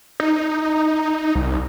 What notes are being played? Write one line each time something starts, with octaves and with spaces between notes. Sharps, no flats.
D#4
C2